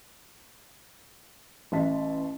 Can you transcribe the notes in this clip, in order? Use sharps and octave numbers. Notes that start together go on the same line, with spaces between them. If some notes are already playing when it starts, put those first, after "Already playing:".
A1 E5 A5 B6